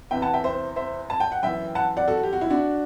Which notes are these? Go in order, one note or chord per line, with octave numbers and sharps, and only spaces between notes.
E2 C3 E3 E5 G5
F#5 A5
E5 G5
C5 E5
C5 E5
A5
G5
F#5
F#2 E3 E5 G5
F#5 A5
D5 F#5
F#4 A4
G4
F#4
E4
D4 F#4